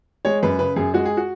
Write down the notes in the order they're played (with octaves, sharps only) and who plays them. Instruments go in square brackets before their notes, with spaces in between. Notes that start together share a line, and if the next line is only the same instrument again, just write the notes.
[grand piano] G#3 C#5
F#2 B4
C#3 B4
F#2 G#4
G#3 F#4
G#4
F#4